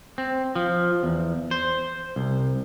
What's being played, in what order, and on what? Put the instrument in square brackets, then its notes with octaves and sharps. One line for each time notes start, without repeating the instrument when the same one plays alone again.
[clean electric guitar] C4
F3
E2
C5
C2